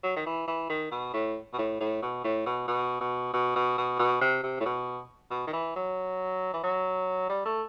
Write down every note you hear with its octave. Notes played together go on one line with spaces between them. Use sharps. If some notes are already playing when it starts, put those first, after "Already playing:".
F#3
D#3
E3
E3
D#3
B2
A2
B2
A2
A2
B2
A2
B2
B2
B2
B2
B2
B2
B2
C3
C3
A2
B2
B2
D#3
E3
F#3
E3
F#3
G3
A3